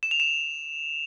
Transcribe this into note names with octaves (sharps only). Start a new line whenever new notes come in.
E7
F7
E7